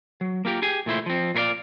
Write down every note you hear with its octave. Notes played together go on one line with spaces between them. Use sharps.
F#3
A#3 F4 G4 A#4
G4 G#4 G#5
A#2 A3 E4 C5
F3 C4
A#2 F4 A#4 D5 F5